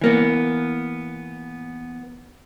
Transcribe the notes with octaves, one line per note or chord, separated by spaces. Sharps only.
E3 A#3 B3